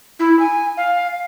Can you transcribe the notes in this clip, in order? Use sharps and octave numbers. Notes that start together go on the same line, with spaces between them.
E4
G#5
F5